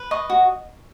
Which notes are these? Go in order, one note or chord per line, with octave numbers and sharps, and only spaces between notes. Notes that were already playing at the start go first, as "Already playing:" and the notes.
Already playing: B4
D#5 C#6
F#4